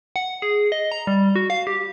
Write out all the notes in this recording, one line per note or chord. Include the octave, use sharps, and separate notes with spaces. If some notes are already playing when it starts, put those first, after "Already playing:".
F#5
G#4
D#5
A#5
G3
F#4
F5
G4